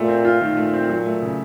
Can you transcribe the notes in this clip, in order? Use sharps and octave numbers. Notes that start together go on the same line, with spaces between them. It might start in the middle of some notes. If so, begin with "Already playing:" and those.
Already playing: A#2 A3
C4
F4
A#2 D#3
A3
C4
F#3
A3
C#3